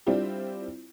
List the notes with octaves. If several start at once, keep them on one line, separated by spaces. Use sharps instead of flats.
G3 C4 D4 E4 F4 G4